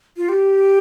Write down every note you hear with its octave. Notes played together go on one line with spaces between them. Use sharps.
F4
G4